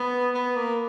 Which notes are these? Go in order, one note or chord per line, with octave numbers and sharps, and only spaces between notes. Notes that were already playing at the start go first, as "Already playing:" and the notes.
Already playing: B3
B3
A#3